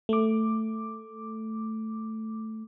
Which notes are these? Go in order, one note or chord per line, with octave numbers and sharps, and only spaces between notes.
A3 D6